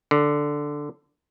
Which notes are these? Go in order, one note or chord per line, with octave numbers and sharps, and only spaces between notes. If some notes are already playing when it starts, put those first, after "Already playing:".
D3